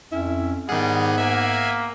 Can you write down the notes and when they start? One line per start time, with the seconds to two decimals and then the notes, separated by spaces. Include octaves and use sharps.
0.12 F2 C#4 E4
0.69 G#2 D#3 G3 B3 G#4 F#5
1.18 A#3 E5 G#5